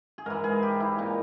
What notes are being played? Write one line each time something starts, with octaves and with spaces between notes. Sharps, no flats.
G#4
G#2 E3 A#4
G#4
G4
E4
A#2 D#4